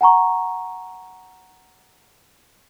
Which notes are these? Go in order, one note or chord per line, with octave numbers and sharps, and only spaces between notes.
F#5 G#5 A#5 C#6